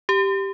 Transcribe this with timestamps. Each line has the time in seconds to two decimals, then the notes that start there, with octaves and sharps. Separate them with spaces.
0.09 G4